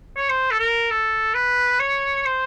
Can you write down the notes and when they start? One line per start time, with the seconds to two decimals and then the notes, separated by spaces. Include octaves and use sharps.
0.17 C#5
0.29 C5
0.51 A4
0.60 A#4
0.90 A4
1.34 B4
1.80 C#5
2.26 C5